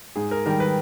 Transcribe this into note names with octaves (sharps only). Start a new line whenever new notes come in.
G#2 G#4
A#4
D#3 G3 A#4
B4